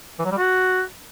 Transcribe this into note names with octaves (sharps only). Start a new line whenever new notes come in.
E3
F#3
G3
F#4